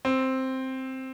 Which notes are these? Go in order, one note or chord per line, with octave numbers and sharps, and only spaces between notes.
C4